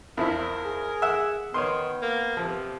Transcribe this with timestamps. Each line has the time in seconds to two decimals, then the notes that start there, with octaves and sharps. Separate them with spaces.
0.17 E2 F3 E4 A#4
0.65 G#4
1.02 E5 F#5
1.54 D#3 B3 C#5 C6
2.02 A#3
2.37 C3 F3